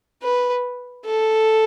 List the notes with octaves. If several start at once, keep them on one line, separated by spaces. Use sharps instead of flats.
B4
A4